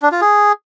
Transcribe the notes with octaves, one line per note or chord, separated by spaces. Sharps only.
D4
F4
G#4